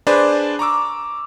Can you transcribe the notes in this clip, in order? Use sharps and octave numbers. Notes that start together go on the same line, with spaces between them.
D4 G#4 B4 C5 D5
A#5 C#6 D6 E6